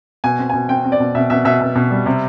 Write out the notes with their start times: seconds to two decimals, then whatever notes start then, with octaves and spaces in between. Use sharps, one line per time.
0.24 B2 G#5
0.39 C4
0.50 B2 G#5
0.69 C4 G5
0.85 C4
0.92 D5
1.00 B2
1.15 B2 E5
1.30 B2 E5
1.45 B2 E5
1.61 B2
1.75 B2
1.91 G3
2.06 C3